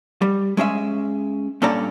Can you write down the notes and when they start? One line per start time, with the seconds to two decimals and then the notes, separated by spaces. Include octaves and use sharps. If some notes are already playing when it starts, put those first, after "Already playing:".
0.22 G3
0.57 G#3 C#4 G#4 E5
1.62 G2 A#2 C#4 A4 D5 A#5